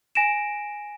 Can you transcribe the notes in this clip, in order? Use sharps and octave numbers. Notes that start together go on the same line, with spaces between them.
G#5 A#6 D7 E7